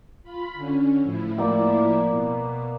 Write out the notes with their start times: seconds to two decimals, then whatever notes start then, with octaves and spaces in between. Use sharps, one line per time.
0.23 F4 B5
0.54 D3 C#4
1.01 A2 F3 E4
1.38 A#3 D5 G5
2.07 B2